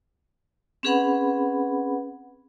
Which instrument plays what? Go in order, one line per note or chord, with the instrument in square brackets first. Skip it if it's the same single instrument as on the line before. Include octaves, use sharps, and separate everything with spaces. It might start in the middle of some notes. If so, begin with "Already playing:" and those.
[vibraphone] C4 C#4 G#4 B4 F#5 B5